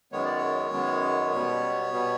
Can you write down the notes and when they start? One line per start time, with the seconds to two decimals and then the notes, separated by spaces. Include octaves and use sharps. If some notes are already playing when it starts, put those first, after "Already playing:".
0.12 F#2 D#3 G#3 B3 C#5
0.25 D5
0.37 C#5
0.72 F#2 D#3 G#3 B3
1.33 B2 G3 B3
1.93 B2 G3 B3